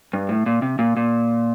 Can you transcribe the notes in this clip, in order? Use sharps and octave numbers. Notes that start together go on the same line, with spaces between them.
G2
A2
A#2
C3
A#2
A#2